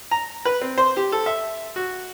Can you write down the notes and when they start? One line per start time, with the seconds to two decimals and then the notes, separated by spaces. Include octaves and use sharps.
0.11 A#5
0.45 B4
0.61 C4
0.78 C5
0.97 G4
1.12 A4
1.26 E5
1.76 F#4